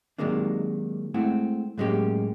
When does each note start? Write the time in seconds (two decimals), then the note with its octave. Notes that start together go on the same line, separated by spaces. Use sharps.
0.18 C3 D#3 F#3 G#3 A#3 D4
1.14 G#3 A3 C4 E4 F#5
1.78 A2 F#3 G#3 A#3 C#4 G4